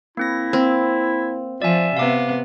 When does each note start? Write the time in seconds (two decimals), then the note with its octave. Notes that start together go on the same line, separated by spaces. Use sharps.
0.17 A#3 C4 E4 A#6
0.53 A#3 C4
1.62 F3 D5 E5 G#5
1.97 C3 B3 F5 D6